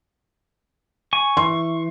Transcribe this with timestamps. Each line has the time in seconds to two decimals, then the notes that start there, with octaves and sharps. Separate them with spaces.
1.13 G#5 C#6
1.37 E3 C6